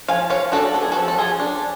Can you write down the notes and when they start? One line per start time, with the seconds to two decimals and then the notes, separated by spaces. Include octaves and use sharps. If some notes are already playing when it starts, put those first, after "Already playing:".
0.08 F3 F5 G#5
0.30 F3 C#5 F5
0.52 D4 F#4 A4
0.74 B3 A4
0.82 G#4
0.92 F#4 A4
0.97 F3
1.08 A4
1.18 F3 F4 G#4
1.40 D4